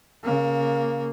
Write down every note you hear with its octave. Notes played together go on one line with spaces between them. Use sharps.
C#3 A#3